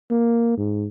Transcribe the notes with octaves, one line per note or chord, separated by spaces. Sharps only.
A#3
G#2